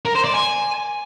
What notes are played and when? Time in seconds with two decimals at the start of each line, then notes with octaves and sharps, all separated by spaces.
0.05 A#4
0.15 C5
0.24 D5
0.34 G#5